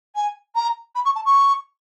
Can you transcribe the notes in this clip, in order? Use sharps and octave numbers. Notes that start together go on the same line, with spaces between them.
G#5
A#5
B5
C#6
A5
C#6